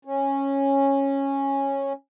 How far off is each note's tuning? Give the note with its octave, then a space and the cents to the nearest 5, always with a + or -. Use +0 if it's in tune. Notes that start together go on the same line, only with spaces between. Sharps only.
C#4 -10